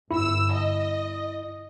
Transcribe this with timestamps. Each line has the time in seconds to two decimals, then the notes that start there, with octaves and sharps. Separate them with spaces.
0.11 G1 E4 E6
0.53 D#5